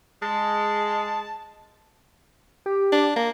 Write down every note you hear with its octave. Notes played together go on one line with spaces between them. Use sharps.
G#3 A5
G4
D4
A#3